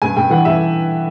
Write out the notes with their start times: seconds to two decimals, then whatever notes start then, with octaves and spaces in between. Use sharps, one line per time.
0.02 G2 G#5
0.17 G2 G5
0.30 E3 F#5
0.45 G2 E5